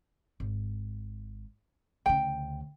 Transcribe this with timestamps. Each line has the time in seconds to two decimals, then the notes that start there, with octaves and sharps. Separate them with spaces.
0.40 G#1
2.06 D2 C#3 G5